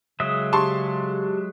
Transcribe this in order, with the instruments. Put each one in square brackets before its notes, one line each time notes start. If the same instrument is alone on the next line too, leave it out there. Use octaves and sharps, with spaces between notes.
[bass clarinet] C#3 [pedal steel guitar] F#3 G#3 E5 [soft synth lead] D#6
[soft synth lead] G4 [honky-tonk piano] A5 C6 C#6